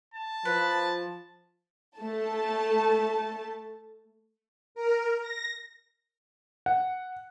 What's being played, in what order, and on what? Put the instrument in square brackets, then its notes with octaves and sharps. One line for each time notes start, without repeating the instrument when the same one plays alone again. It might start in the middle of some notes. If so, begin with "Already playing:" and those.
[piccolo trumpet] A5
[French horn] F3 [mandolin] B4
[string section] A3 A5
[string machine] A#4
A#6
[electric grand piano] F#5